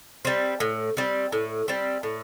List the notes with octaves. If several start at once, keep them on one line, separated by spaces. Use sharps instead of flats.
G3 C4
A2
G3 C4
A2
G3 C4
A2